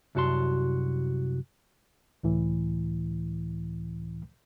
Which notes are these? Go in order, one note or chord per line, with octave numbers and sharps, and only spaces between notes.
C2 F#2 F#4 A5 C6
C#2 A2 E3